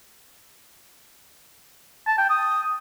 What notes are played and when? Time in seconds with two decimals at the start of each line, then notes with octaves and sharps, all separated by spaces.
2.07 A5
2.18 G5
2.29 D#6